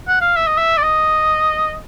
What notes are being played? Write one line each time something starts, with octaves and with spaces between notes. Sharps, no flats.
F#5
F5
E5
D#5
E5
D5
D#5